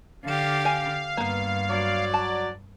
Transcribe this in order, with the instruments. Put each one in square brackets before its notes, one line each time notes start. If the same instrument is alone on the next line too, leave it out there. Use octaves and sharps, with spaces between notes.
[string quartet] D3 G4 [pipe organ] F5
[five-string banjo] G#5
[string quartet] G2 [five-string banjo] A#3 B3
[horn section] F#3 D5
[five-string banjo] A5